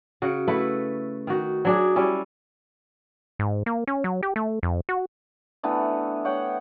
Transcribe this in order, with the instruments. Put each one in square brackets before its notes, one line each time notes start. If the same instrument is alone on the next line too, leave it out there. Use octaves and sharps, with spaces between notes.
[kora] C#3 F#4
A3 E4 B4 F#5
D#3 F#4
F#3 D4 G#4
G3 C#4 E4
[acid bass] G#2
A#3
C#4
F#3
G4
A3
F2
F#4
[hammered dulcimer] E3 A3 B3 D4
C#5 F#5 G5